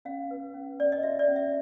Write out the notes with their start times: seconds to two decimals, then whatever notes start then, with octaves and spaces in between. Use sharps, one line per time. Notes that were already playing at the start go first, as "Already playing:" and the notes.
0.05 C#4 F5
0.31 B4
0.54 C#4
0.79 C#4 D5
0.92 D#5
1.03 F#4 E5
1.19 D5
1.28 C#4
1.36 E5